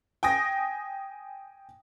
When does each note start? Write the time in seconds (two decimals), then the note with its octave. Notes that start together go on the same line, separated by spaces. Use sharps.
0.23 G5 G#5 D#6 A#6